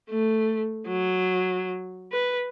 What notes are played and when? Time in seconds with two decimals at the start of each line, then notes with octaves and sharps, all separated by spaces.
0.10 A3
0.88 F#3
2.12 B4